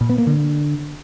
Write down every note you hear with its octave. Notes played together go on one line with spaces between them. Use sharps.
A#2
B3
A#3
D3